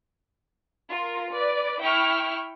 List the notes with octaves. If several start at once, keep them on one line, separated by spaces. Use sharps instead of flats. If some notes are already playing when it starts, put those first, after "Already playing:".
F4 A#4
B4 D5
E4 G5 C#6 F6